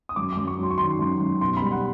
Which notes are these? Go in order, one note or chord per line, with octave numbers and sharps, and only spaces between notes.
D#6
F#2 D6
F#2 D6
C#6
F#3
C6
C#6
D#3 C6
F#2
F#2
B2 C6
G3 B5
F#5